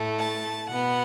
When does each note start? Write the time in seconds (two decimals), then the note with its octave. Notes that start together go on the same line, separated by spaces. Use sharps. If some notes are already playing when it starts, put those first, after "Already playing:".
Already playing: A2 A3
0.20 A5
0.70 B2 B3 F#5